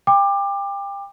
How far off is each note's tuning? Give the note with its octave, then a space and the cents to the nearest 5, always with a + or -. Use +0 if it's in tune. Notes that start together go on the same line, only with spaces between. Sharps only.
G5 +30 B5 +0 D6 +20